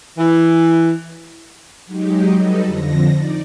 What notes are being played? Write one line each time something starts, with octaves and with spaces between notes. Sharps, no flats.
E3
F#3 G#3 D#4 G4
F#3 G3 D#4 A4 B4 D#5
F2 D3 F3 A#6
D#4 D5